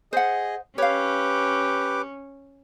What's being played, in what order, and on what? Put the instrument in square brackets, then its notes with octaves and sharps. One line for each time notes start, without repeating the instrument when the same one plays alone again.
[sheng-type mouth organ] G#4 D#5 [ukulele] C5 F#5
[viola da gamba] C#4 [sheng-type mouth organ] G4 [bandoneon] B4 D6 [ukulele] C#5 F5